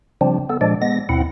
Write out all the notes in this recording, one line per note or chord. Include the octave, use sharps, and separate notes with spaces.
C#3 F3 G3 C4 D4
B3 A4
A#2 F3 G#3 D4 D5
G#3 B3 A#6
D#2 B2 C4 E4 F#5